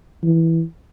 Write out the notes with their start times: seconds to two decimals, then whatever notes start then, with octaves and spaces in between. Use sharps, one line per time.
0.23 E3